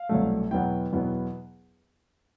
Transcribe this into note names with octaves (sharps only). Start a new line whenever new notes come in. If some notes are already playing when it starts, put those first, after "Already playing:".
Already playing: F5
C2 B2 F#3 A3
E2 B2 F#3 B3 E4 G5
E2 B2 F#3 B3 E4